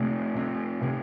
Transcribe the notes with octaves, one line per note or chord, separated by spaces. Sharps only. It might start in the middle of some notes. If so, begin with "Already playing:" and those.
Already playing: C3 A3
C3
C3